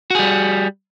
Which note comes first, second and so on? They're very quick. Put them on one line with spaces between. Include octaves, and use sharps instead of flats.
F#4 G#4 G3